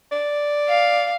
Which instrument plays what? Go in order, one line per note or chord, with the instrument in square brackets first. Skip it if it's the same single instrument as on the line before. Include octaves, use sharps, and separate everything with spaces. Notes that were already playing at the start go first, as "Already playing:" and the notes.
[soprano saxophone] D5
[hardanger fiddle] F5